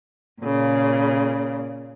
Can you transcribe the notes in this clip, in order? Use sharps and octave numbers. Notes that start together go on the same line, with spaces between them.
A#2 C#3